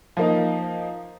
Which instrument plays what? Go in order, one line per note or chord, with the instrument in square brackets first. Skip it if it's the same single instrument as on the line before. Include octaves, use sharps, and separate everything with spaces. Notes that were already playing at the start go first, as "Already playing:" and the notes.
[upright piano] F3 A#3 D#4